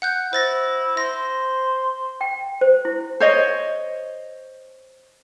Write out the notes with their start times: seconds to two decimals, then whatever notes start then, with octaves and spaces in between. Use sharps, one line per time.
0.02 F#5 F#6 G6
0.33 E4 C5 A6 A#6
0.97 C5 A#6
2.21 G5
2.61 C5
2.85 E4
3.20 C5 C#5 D#5